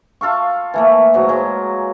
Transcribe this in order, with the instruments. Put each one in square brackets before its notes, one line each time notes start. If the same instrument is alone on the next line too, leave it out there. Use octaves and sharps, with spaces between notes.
[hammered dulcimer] F4 A4 F5 C#6
E3 A3 A#3
G#2 F#3 F#4
F#3 G#3